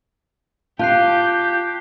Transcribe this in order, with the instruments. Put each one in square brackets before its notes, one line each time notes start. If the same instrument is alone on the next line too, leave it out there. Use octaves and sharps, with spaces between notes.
[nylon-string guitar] F4 [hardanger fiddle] G4 [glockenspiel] A5 F#6 C7 [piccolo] G6